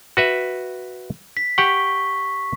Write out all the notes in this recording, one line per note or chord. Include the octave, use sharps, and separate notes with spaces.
F#4 B4 E5
B6
G4 F#5 C#6